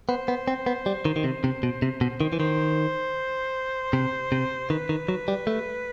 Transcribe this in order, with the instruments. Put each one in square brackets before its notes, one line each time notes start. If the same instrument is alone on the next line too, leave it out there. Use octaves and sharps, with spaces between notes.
[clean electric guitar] B3 [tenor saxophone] C5
[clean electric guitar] B3
C4
B3
G3
D#3
D#3
C3
C3
B2
C3
B2
D#3
E3
[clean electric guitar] D#3 [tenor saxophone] C5
[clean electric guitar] C3
C3
[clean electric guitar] D#3 [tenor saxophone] B4
[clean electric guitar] D#3
F#3
G3
A3